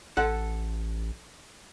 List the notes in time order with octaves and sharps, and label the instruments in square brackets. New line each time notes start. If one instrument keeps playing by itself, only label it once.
[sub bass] A1 [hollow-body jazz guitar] A4 F#5